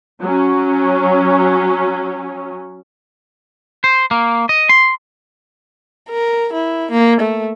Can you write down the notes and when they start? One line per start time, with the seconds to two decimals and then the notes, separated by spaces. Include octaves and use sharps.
0.22 F#3 C#4
3.84 C5
4.11 A#3
4.49 D#5
4.69 C6
6.10 A#4
6.53 E4
6.91 A#3
7.20 A3